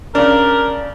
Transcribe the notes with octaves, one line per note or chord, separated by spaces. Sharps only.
C#3 D4 A#4